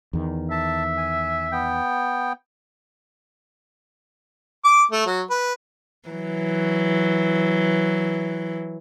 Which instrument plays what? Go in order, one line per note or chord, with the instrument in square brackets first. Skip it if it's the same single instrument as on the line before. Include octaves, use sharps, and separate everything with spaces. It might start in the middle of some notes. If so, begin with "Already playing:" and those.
[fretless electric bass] E2 D#3
[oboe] E5 [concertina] A5
[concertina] G#5
B3 G5
[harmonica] D6
A3
F#3
B4
[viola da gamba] E3 F#3